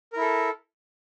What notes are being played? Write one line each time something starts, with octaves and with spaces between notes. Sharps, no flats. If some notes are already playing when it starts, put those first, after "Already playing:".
E4 A4 A#4